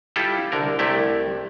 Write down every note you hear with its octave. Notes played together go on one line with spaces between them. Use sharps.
G3 E4 F4 G4 A4
C2 D3 A#4
C2 C3 A3 E4 G4